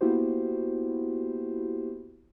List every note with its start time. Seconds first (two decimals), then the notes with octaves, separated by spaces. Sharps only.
0.01 A#3 B3 E4 F#4 G4 C5